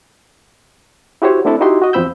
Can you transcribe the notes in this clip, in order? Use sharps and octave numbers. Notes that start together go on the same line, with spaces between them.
E4 F#4 G4 C5 C#5
A3 C4 D4 E4 A4
D#4 E4 F#4 G4 C6
F#4 D#5
E2 F3 C4 B5 E6 G6